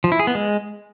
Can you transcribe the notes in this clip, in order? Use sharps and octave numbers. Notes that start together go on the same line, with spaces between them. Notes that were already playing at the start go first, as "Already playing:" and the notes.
F3
E4
G#4
B3
G#3